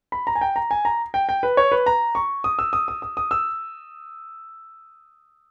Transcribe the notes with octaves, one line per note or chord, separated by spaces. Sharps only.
B5
A#5
G#5
G5
A#5
G#5
A#5
G5
G5
B4
C#5
B4
A#5
C#6
D#6
E6
D#6
D#6
D#6
D#6
E6